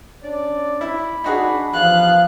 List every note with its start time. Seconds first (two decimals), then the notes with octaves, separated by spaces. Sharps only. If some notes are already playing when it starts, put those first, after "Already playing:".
0.23 C#4 D4 D5
0.81 E4 B5
1.24 D4 D#4 F#4 G#4
1.73 G2 E3 F3 B3 F5 F#6